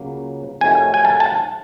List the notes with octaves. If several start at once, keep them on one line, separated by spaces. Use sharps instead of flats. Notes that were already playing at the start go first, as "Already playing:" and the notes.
Already playing: C#2 C#3 F#3 A#3
F2 C3 D#3 F#3 A3 G#5
G#5
A5
A5